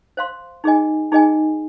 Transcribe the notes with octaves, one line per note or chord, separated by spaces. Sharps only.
C5 F5 C6
D#4 G#4 D#5 G#5
D#4 G#4 D#5 G#5